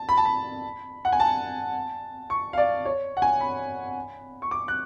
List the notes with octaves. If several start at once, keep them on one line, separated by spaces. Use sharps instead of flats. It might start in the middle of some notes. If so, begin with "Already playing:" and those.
Already playing: A5
B5
A5
B5
F#5
G#5
A5
C#6
F5
D5
C#5
F#5
G#5
B5
C#6
D6
F#6